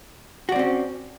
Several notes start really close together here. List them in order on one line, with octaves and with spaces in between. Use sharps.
F#4 D5 C4 C#4